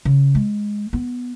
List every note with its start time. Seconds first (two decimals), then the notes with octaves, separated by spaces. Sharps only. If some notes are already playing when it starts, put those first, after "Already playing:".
0.05 C#3
0.35 G#3
0.93 B3